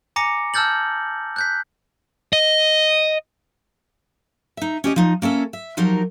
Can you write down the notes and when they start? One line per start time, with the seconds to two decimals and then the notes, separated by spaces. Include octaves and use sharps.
0.16 G#5 A#5 D6 A#6 C#7
0.54 A5 E6 F6 G6 A6 F#7
1.36 F#6 G6 B6
2.33 D#5
4.57 D#4 E5
4.84 C#4 G4 D#5
4.96 F3 D#4
5.22 A#3 C#4 A4 E5
5.53 E5
5.77 F3 F#3 D#4 G4 A#4